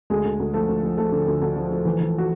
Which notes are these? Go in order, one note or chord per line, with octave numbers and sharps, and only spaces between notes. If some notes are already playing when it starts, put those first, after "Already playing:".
D2 G#3 G#4
D2
D2
F3 A3 A4
D2
F3
F3 A3 A4
D3
D2
D2
F3
F3
E3
E3
F#4